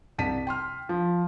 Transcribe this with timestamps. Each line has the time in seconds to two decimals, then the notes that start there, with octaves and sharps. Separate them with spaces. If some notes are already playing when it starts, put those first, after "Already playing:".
0.18 C2 A5 B6 D#7
0.47 G5 C6 F6
0.89 F3